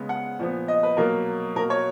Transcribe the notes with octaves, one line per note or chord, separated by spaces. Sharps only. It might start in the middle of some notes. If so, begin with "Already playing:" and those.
Already playing: C#3 G#3 B3
F#5
A#2 F3 B3
D#5
B4
B2 F#3 A#3 A#4
B2 A#3 A#4
C#5